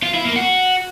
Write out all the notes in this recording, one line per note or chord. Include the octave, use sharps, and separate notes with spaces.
F4
E4
A#3
F#4